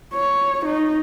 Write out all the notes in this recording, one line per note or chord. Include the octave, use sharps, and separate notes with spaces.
C#5
D#4